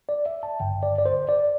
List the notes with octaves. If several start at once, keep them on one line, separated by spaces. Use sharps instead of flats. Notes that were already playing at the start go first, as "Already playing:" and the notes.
D5
E5
A5
G1 G2 D3 G5
D5
D5
C5
D5